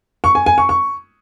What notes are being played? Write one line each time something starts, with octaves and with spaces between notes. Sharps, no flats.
C#6
G#5
G#5
C#6
C#6